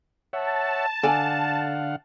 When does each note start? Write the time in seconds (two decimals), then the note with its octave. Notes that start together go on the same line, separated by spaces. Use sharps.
0.33 C#5 E5 F#5 A5
1.03 D3 A4 D5 F5 F#5 G#5